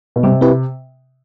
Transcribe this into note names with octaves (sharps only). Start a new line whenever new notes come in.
B2
C3 G3
C4 E4 G4 B4